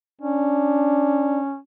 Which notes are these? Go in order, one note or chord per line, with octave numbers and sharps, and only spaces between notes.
C#4 D4